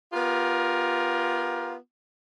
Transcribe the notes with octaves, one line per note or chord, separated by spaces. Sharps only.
B3 F4 G4 A#4